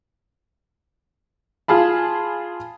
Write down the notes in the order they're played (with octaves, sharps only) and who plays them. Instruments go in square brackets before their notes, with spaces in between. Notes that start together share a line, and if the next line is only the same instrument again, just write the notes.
[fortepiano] F4 G#4 A5 B5